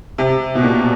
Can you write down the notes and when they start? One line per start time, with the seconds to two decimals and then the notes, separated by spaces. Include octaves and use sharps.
0.18 C3
0.55 B2
0.63 A#2